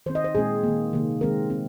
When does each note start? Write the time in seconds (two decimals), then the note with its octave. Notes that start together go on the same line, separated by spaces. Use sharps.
0.06 D#3 C4 C5
0.15 D#5
0.24 C5
0.35 A#2 G#3 C4 G#4
0.63 D#3 A#3
0.93 C3 D#3 A#3
1.21 D#3 G#3 C4 A#4
1.50 C4